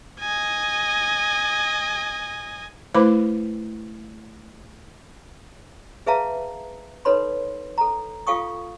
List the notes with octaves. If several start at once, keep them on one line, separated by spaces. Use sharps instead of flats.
D#5 G#5
A3 E4 B4 C5 B5 D6
G#4 B4 E5 F5 A5 A#5
D#4 A4 B4 C#5 B5 C6
A4 A#5
F4 A4 F5 G5 C#6 D#6